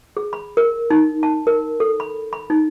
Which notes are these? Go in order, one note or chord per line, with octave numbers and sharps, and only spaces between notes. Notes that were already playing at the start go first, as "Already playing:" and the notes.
G#4
B5
A#4
D#4
A5
A#4
A4
B5
B5
D#4